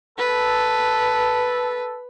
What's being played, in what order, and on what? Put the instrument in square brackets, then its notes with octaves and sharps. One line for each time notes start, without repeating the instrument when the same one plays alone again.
[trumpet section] A4 [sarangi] B4